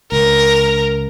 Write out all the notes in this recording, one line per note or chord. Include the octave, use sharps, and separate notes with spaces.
C#2 A#4